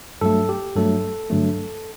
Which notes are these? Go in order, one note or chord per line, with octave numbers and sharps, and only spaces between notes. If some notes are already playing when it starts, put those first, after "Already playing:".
G2 F#3 A3 A4
G4
G2 F#3 A3 A4
G2 D3 F#3 A3